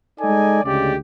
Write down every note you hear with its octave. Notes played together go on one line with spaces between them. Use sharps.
G#3 D#4 A4 D5 D#5 G#5
D2 C#3 G#3 G4 D5